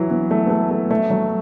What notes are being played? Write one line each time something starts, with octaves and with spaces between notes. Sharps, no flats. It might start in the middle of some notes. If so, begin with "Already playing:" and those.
Already playing: E3 F#3
B3
A3
B3
A3
A3
A3
F#3